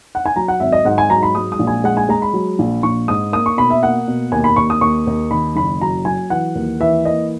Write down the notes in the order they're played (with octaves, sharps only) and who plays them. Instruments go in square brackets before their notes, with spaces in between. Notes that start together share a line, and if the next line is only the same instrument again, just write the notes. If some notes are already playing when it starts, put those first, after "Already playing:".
[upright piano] F#5
G#5
F#3 A#5
F#5
G#1 E5
D#5
G#2 F#5
G#5
F#3 A#5
B5
G#3 D#6
D#6
A#1
G#5
G#3 F#5
G#5
G#3 A#5
B5
F#3
A#1
A#1 C#6
G#2 D#6
A#3 D#6
C#6
B2 B5
E5
A#3 F#5
B2
D#2 G#5
B5
D#2 C#6
D#6
D#2 C#6
D#2
D#3 B5
F#1 B5
F#3 A#5
F#3 G#5
E3 F#5
D#2
E3 E5
A#3 D#5